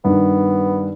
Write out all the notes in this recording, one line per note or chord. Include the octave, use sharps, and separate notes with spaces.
G2 D#3 B3